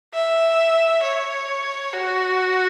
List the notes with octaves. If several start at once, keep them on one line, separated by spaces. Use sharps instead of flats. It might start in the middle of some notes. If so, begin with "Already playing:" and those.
E5
C#5
F#4